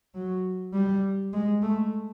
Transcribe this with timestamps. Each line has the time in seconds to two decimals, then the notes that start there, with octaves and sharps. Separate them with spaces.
0.15 F#3
0.73 G3
1.33 G#3
1.62 A3